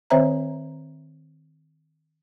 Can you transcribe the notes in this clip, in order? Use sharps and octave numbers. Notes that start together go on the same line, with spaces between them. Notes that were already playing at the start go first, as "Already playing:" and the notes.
D#3 C4 C5 C#5 E5 A#5